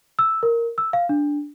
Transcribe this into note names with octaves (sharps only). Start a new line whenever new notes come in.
E6
A#4
E6
F5
D4